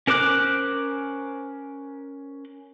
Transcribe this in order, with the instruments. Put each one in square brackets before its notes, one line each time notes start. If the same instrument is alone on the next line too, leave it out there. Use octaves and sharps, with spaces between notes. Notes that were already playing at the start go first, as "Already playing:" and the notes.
[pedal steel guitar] C#4 A#4 C5 D6 F#6